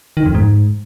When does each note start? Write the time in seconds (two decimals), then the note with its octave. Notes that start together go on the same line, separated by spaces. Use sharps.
0.17 D#3
0.26 F2
0.35 G#2